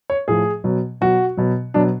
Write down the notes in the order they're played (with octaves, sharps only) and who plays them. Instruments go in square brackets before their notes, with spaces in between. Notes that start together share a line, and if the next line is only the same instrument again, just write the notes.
[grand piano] C#5
A2 F3 G#4
B2 F#3
B2 F#3 F#4
B2 F#3
B2 F#3 D4